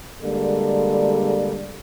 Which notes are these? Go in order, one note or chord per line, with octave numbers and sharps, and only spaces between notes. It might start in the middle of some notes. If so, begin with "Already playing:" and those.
D3 G3 G#3 A#3 A4 D5